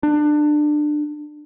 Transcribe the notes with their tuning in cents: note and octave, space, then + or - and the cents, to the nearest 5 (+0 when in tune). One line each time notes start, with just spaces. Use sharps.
D4 +25